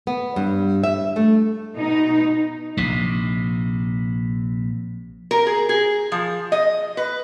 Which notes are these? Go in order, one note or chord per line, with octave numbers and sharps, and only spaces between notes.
B3
G2
E5
A3
B2 D#4
A#1 C3
A#4
G#4
G#4
F3
D#5
B4